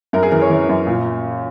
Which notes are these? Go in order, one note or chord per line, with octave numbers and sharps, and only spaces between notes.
F#2 A#4
G#4
E3 A#4
C#5
E3
F#2
A#2